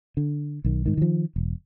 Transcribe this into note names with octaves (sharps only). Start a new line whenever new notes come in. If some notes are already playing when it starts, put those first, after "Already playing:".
D3
B1 D#3
G#2 D#3
D#3 F3
E1